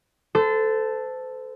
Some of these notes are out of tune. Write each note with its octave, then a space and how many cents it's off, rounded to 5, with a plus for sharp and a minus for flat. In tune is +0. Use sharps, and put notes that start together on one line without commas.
A4 +0 C5 -35